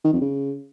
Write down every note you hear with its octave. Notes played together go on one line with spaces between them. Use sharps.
D#3
F2
C#3